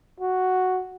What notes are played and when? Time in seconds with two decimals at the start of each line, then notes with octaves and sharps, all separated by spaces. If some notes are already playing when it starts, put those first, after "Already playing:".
0.20 F#4